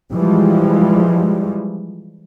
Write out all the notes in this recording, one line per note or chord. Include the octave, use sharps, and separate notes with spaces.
E3 F3 G3 G#3